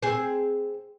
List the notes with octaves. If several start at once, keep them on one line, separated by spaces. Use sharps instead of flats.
C4 G#4